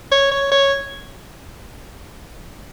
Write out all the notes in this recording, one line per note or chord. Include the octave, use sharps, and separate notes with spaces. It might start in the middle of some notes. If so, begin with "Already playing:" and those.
C#5
C#5
C#5